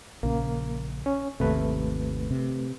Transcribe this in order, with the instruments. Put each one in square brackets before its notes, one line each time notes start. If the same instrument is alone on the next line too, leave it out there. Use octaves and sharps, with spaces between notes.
[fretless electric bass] A#1 C#3 C#4 [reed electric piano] A#3
[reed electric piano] C#4
[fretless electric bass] G#1 D#2 C3 [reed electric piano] A3 B4
[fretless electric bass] C3